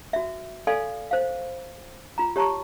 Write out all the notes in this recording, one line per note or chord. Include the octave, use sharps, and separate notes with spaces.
F#4 E5
A4 D5 F5 G#5 C6
C5 F5
F4 A#5
G4 C#5 A5 A#5 C#6